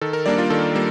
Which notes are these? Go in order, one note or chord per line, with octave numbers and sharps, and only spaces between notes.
D#3 A4
A#4
G3 A#3 D4 D5
F4
D#3 A4
G3 A#3